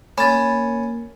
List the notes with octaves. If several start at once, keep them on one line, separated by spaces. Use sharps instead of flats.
A#3 C#4 B5 A6